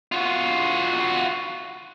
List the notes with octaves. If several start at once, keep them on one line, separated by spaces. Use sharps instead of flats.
F4 F#4